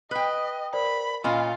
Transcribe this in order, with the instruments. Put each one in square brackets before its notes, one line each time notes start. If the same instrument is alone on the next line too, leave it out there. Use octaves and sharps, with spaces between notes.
[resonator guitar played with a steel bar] B4 G5 [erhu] D#5 [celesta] B6
[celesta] A#4 C5 D5 [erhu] B5
[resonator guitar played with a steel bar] A#2 A#3 C#4 [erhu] F4 [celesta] D#5 B5 C6